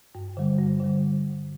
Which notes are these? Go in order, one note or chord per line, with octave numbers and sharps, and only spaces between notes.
G2
D3 G3
G2
D3 G3